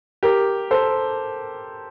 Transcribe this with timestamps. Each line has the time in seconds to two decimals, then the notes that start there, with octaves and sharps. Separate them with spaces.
0.23 G4 A#4
0.71 A4 C5